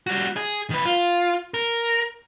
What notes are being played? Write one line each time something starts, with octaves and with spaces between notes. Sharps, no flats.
G3 F#4
G#4
D#3 B4
F4
A#4